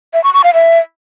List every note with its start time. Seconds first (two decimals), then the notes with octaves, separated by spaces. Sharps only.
0.14 E5
0.24 C#6
0.34 C#6
0.44 F5
0.54 E5